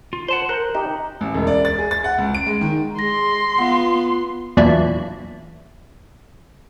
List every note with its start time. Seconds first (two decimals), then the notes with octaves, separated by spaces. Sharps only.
0.13 F4
0.28 C5 F#5 A5 C6
0.49 A#4 F#6 G6
0.75 D#4 G4
1.21 A1
1.34 E1
1.47 D5
1.65 A6
1.78 G#4
1.91 A6
2.04 F#5
2.18 C#2
2.35 D7
2.47 G#3
2.61 D#3
2.99 G#3 C6 A#6
3.58 B3 F4 F5 F#5
4.57 E2 A#2 F#3 D4 E4